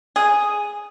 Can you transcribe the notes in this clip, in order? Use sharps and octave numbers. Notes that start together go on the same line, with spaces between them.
G#4